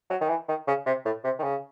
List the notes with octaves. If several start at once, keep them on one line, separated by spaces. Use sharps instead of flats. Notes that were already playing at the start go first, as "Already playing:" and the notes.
F#3
D#3
E3
D#3
C#3
C3
A2
C3
D#3
C#3